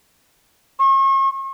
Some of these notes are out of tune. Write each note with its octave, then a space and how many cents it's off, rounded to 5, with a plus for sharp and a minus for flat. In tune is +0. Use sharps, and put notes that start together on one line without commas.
C#6 -40